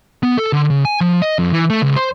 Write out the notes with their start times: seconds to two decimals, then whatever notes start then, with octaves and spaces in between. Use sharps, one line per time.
0.23 B3
0.37 A4
0.53 D3
0.70 C#3
0.85 G#5
1.01 F3
1.22 D#5
1.39 F2
1.53 E3
1.70 A3
1.82 C#2
1.96 C5